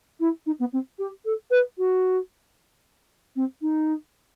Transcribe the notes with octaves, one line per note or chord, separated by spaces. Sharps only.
E4
D#4
B3
C4
G4
A4
B4
F#4
C4
D#4